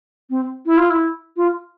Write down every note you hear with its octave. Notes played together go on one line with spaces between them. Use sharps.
C4
E4
F4
E4
F4